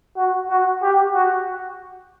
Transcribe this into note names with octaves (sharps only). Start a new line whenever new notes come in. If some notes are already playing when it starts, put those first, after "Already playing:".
F#4
F#4
G4
F#4